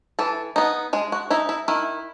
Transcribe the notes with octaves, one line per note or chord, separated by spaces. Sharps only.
E3 A4
B3 D#4
G#3 G#4
F#4
D#4 E4
E4
D#3 E4